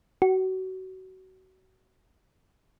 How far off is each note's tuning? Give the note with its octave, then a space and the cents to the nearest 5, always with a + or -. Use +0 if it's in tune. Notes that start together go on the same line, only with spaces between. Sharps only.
F#4 +25